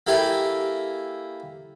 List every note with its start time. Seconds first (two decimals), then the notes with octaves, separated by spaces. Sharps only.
0.07 A#3 E4 G4 A4 G#5